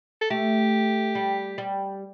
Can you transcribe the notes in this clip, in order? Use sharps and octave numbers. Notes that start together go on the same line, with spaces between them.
A4
A3 G4
G3
G3